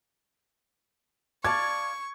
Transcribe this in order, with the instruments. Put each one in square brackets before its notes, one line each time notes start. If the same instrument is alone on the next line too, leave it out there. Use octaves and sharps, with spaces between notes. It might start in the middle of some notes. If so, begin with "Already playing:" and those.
[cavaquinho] D5 F5 A5 [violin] C#6 [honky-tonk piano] G#6